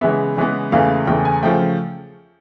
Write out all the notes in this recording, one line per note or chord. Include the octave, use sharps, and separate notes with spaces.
C#3 E3 G#3 B3 E5
C#3 E3 G#3 B3
E2 C#3 E3 A3 F5
E2 C#3 E3 A3 G5
G#5
C#3 F3 A3 G5